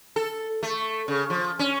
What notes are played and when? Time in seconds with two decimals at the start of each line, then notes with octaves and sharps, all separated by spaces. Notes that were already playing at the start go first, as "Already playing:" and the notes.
0.16 A4
0.63 A3
1.08 C#3
1.30 F3
1.59 C#4